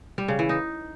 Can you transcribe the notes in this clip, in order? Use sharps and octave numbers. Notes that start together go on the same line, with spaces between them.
G3
C#3
E3
D#4